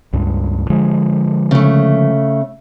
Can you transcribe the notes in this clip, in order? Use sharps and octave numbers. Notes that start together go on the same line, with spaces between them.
C#2 G2
D3 F3 G#3
C#3 A3